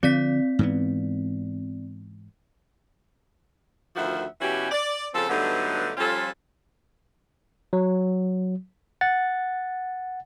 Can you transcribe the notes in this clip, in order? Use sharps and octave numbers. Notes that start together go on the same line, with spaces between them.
D3 F3 C4 D5 B6
G#2 E3 B3
D2 D#3 F3 F#4 E5 F#5
B2 E3 C#4 F#4 G4
D5
C#3 F3 C4 A4
G2 D3 F#3 A3 B3 D#4
F3 G3 C#4 F4 A4
F#3
F#5 A6